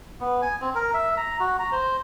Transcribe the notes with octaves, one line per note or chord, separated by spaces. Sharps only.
B3
G#5
C4
A#4
E5
A#5
F#4
A#5
C5